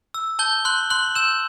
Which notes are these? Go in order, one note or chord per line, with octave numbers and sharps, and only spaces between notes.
E6
A5 G6 G7
C6 F#6 F#7
C6 F#6 F#7
E6 G6 E7